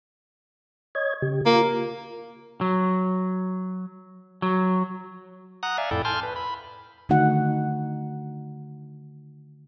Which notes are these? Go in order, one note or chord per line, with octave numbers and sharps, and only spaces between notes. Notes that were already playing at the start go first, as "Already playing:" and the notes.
C#5 D#5 G#6
C#3 G4
A#3 F4
F#3
F#3
F#5 A#5 D#6 F#6
D5 E5 F5 G#5
F2 A2 E4 A4 D5 G5
G#5 A5 C6 F6 G6
B4
B5
D3 D#3 A3 D#4 F#4 F#5